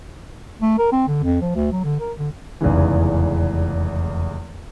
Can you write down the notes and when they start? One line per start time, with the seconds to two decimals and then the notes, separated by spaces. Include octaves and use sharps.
0.62 A3
0.78 A#4
0.92 C4
1.08 D3
1.23 F2
1.42 F3
1.55 D2
1.72 F#3
1.84 D3
2.00 A#4
2.18 D3
2.61 F1 E2 G#2 C#3 E3